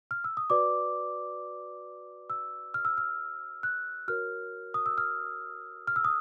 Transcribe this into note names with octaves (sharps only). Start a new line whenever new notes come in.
F6
E6
D#6
F#4 B4 D5 D6
E6
F6
E6
F6
F#6
F#4 A#4 C#5 F6
D#6
E6
F6
F6
E6
D#6